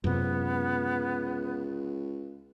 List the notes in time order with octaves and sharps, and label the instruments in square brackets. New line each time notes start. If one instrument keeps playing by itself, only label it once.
[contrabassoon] C#2 [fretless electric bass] F#2 C3 [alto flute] B3